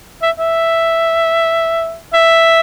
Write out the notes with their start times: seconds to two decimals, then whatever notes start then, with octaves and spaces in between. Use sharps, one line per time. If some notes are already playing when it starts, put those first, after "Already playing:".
0.22 E5
0.39 E5
2.14 E5